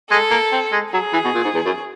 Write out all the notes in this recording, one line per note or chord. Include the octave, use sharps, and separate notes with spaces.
G#3 A4
A#3
C4
G#3
F#3 G#4
E3
B2
A#2
G#2
E2
F#2